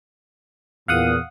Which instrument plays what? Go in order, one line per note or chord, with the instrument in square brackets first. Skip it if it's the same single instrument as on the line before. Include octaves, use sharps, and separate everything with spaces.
[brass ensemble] E2 A#2 [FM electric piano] F5 F#5 D#6